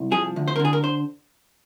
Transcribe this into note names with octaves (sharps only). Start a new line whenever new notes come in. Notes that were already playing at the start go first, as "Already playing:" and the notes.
Already playing: C2
F3 G#4
D2
C5
A#4
D3
G#4
A#4
C5